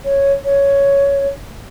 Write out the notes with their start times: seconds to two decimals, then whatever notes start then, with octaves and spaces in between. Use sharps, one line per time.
0.05 C#5
0.44 C#5